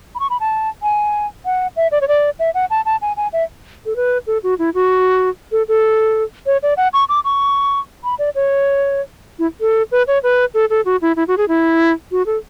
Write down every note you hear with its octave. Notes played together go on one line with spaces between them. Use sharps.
B5
C#6
B5
A5
G#5
F#5
E5
D5
C#5
D5
E5
F#5
A5
A5
G#5
G#5
E5
A4
B4
A4
F#4
E4
F#4
A4
A4
C#5
D5
F#5
C#6
D6
C#6
B5
D5
C#5
E4
A4
B4
C#5
B4
A4
A4
F#4
E4
E4
F#4
G#4
E4
F#4
A4